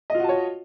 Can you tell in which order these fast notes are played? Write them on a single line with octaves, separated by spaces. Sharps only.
D#5 F4 F#4 A5 C#5